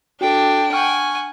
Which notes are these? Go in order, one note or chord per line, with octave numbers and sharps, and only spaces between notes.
D4 F#4 A4 G5
F#5 G#5 C#6 F6